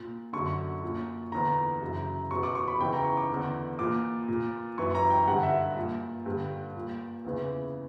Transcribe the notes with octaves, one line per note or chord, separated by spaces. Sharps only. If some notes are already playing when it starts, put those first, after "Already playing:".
Already playing: A#2
F#2 D3 C#6
A#2
E2 D3 A#5
F#2 C#3 E3
E2 B2 C#6
D6
C#6
B5
E2 C#3 E3 G5
A#5
C#6
D6
E2 D3
A#2 D6
A#2
F#2 E3 C#6
A#5
G5
G2 D3 F#5
E5
A#2
G2 D3
A#2
E2 C#3 E3